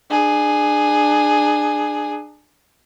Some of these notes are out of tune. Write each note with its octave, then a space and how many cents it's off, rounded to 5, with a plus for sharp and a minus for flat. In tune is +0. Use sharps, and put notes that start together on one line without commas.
D4 +30 G#4 +0